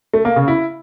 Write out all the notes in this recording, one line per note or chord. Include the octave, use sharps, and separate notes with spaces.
A3
A#3
C#3
E4